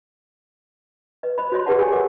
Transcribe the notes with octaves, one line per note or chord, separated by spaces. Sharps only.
B4 D#5
C5 D#5 B5
F#4 C5 C#5 D#5 C6
G4 G#4 B4 D5 F#5 A5
G#4 A4 C#5 G5 G#5
A4 A#4 D#5 F#5 D6